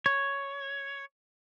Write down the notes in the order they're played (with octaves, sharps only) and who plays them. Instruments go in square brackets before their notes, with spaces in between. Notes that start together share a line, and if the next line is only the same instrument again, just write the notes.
[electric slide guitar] C#5